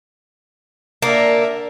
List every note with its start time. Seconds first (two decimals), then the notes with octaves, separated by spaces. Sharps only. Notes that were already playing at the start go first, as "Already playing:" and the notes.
1.02 D3 A#3 A#4 D5 E5